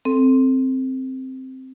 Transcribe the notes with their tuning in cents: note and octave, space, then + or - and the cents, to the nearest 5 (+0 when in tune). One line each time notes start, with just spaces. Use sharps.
C4 +0 A4 +0